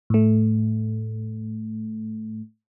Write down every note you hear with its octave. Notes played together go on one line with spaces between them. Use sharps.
A2 A3